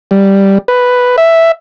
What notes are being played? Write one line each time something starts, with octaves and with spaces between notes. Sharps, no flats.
G3
B4
E5